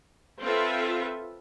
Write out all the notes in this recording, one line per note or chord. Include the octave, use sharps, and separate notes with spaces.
C4 F4 A4 B4 E5